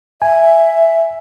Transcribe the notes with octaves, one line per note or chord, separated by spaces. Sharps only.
E5 G#5